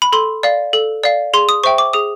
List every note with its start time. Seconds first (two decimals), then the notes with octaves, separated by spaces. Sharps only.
0.02 B5
0.13 A4 C6
0.43 D5 F5
0.73 A4
1.04 D5 F5
1.34 G#4 C6
1.49 D#6
1.64 C5 E5 G5 C#6
1.78 D6
1.93 G#4 D#6